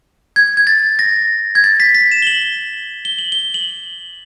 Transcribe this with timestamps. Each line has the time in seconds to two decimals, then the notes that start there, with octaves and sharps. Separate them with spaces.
0.36 G#6
0.57 G#6
0.67 A6
0.99 A#6
1.55 G#6
1.64 A6
1.80 B6
1.95 B6
2.12 E7
2.22 G7
2.27 F#7
3.05 G7
3.18 F#7
3.32 G7
3.54 F#7